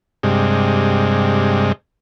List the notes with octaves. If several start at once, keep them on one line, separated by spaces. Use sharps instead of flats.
G2 C3 G#3